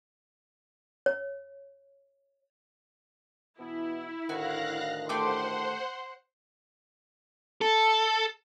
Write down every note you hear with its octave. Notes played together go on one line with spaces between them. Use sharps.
C#5
B2 E3 B3 E4
D2 A2 D#3 F#4 F5 F#6 A#6
A3 G4 C5 F#5 C6 D6
A4